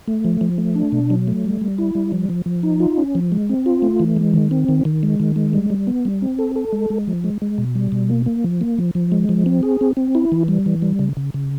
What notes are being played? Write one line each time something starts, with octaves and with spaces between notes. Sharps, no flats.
A3
F3
F3
A3
D4
B2
F#3
A3
G3
G3
E4
G3
F3
F3
F3
D#4
F4
C#4
F3
G#3
C4
F4
A3
E3
G#3
D#3
C4
D#3
D#3
G#3
D#3
G#3
G3
G3
B3
G3
C4
A4
A4
G#3
G#3
F3
G#3
G#3
B2
G3
B2
A#3
A#3
F3
A#3
F3
F3
G#3
F3
C4
G#4
C4
C4
E4
E3
G3
E3
G3
C#3
C#3
C#3